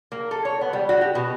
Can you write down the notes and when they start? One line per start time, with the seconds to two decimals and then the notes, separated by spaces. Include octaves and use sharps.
0.12 A#3
0.31 A4
0.45 C#5
0.61 B3
0.73 G3
0.89 F#4
1.01 G4
1.15 B2